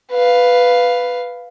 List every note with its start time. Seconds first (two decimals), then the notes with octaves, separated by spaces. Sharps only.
0.11 B4 F5